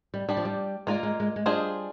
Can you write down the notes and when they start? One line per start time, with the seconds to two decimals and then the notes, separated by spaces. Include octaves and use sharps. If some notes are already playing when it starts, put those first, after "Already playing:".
0.14 G3
0.29 G3 D4 G4 D5
0.37 F3
0.45 G3
0.87 G#3 A#3 F4 A#4 D5
1.03 G#3
1.20 G#3
1.36 G#3
1.46 G3 D4 F4 G#4 C5 D#5